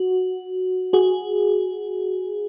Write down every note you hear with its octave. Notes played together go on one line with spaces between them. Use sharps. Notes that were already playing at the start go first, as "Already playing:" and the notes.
Already playing: F#4
F#4 G#4